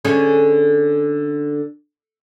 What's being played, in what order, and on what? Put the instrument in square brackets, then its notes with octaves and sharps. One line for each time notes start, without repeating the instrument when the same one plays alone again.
[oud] D3 C#4 G#4